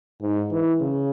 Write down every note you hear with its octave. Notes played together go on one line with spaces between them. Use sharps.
G#2
E3
C#3